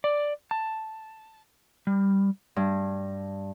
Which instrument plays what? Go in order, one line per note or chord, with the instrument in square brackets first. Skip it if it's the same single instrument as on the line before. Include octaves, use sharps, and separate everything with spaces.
[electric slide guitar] D5
A5
G3
[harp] G2